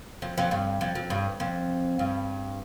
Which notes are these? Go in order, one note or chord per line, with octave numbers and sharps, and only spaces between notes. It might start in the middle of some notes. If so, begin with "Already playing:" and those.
F2
F2
G2
F2
F2
G2
F2
G2